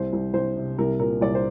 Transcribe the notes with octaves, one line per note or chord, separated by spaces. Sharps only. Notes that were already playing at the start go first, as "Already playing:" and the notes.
Already playing: C2 C5
C2
C2 C5
C3
C2 A#4
A#2 A#4
C2 D5
C5